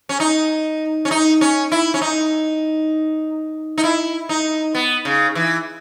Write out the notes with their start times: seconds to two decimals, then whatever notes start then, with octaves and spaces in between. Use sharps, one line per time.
0.09 C#4
0.20 D#4
1.05 C#4
1.11 D#4
1.41 C#4
1.72 E4
1.94 C#4
2.01 D#4
3.78 D#4
3.84 E4
4.29 D#4
4.75 B3
5.05 C#3
5.35 E3